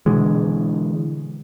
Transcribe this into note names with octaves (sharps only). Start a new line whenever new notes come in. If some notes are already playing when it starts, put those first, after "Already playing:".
B2 D3 E3 G#3